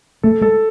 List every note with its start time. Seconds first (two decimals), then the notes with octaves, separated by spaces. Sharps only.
0.23 A3 A4
0.41 G#3 A4